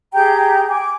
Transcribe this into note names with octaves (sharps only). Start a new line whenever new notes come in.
G4 G#4 G5 A#5
G#5 D6